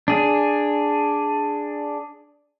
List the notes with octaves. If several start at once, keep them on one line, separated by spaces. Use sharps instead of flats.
D4 G#4